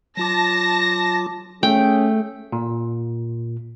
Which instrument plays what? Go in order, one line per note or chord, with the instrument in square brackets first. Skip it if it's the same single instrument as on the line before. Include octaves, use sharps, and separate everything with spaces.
[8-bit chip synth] F#3 F4 D6 [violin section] A5 A#6
[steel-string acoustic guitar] A3 [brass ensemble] C#4 G#4 [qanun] G5
[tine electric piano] A#2